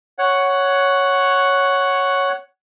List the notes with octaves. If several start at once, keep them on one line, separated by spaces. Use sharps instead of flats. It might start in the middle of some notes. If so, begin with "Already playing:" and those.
C#5 F#5